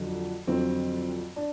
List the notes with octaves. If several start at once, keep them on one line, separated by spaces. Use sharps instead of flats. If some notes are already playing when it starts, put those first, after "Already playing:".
Already playing: F2 D3 F#3
F2 D3 F#3 C4
D4